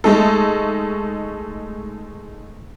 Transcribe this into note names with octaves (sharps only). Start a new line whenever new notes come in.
G#3 A3 D#4 A4